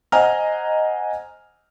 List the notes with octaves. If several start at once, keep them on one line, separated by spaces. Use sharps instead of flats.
C5 D#5 F#5 G#5 A#5 F6